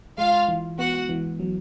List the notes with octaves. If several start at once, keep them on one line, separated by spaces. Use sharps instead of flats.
G#3 F4 F5
E3
B3 F#4 F#5
E3
F#3